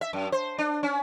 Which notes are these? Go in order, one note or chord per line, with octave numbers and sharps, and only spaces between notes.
E5
F#2
C5
D4
C#4